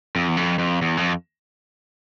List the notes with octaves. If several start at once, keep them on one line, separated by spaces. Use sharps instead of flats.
F2
E2
F2
F2
E2
F2